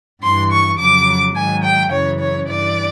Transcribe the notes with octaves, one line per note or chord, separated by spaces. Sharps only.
G2 E3 C6
C#6
F2 C#3 F#3 D6
G#2 D#3 F#3 G#5
G5
F#2 C#3 E3 C#5
C#5
G2 E3 D5